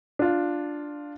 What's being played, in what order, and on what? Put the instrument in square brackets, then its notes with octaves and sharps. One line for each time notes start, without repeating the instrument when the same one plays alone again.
[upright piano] D4 F4